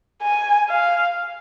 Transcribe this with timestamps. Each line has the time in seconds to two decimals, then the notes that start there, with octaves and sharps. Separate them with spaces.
0.23 G#5
0.70 F5